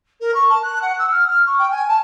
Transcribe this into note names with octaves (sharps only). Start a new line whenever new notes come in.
A#4
C#6
A5
F#6
F#5
E6
F6
F6
C#6
G5
G#5
A5